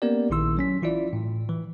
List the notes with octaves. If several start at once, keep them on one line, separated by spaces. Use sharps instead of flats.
A#3 B3 C#4 G4 A#4 D5
A#1 A#2 D#3 E4 C6 E6
F#3 C#4 B6
E3 E4 F4 D5
A2
E3